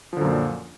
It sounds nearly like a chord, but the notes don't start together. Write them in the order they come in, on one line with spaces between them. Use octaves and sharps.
F3 D3 F#2 A#2